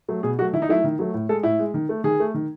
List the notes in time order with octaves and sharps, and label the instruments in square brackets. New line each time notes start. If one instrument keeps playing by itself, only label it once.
[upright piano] F#3 A3
B2 G#4
F#3 A3 F#4
D#3 E4
D#4
F#3 A3 E4
D#3
F#3 A3
A2
G#3 A4
A2 E4
G#3
D#3
A3
D#3 G#4
A3
D#3